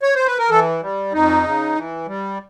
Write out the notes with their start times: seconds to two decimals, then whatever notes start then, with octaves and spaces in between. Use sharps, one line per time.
0.03 C#5
0.15 C5
0.26 B4
0.38 A#4
0.50 E3 A4
0.82 G3
1.13 F2 D#4
1.44 C#3
1.75 E3
2.07 G3